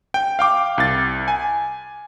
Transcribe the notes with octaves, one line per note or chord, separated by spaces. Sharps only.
G5
F5 G5 D6
C2 A6
G#5